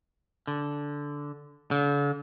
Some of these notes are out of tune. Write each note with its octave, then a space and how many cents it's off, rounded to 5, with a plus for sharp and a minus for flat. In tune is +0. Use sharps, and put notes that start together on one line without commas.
D3 -10
D3 -45